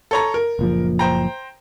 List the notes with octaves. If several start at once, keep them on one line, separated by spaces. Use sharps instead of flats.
A4 C#5 A#5
A#4
F#1 A#2 F3
C5 G5 A#5